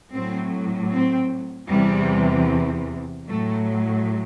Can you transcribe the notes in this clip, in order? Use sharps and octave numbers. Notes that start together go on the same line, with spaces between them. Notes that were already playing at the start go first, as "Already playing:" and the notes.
A2 F#3 C4
C4
E2 C3 E3 G3
A2 F#3 A3